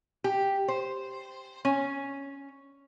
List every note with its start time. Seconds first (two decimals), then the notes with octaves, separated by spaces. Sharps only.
0.24 G4
0.68 C5
1.65 C#4